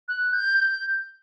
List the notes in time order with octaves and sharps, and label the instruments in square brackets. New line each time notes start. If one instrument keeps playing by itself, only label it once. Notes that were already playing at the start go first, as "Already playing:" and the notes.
[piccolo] F#6
G6
G6